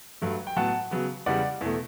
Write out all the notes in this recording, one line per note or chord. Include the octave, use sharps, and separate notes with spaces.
G2 F#3 A3
G5
A2 F#3 B3 F#5 A5
C#3 F#3 B3
E2 C#3 G3 D5 F#5
E2 B2 A3